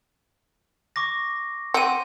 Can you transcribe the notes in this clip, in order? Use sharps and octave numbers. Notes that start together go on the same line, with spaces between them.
C#6 D6 A#6
C4 F#5 D#7